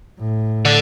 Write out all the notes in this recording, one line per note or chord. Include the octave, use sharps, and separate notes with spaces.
A2
D3